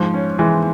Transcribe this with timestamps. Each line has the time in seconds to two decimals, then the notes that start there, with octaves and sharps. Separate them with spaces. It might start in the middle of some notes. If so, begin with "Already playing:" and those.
Already playing: G#2 F3
0.14 C#4
0.39 E3 G#3